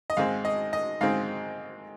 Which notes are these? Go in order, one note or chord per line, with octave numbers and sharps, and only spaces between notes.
D#5
G#2 D#3 G#3 C4 F5
D#5
D#5
G#2 D#3 G#3 C4 F5